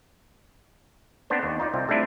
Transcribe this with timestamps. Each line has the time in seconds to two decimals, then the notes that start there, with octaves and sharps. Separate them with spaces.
1.30 B3 C4 D4 C5
1.43 D#2
1.60 D#4 F4 D5
1.74 C2 C4 F4
1.88 G3 A3 C4 D4 E4 F4